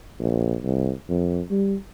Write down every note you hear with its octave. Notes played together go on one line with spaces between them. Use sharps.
A#1
C2
F2
G3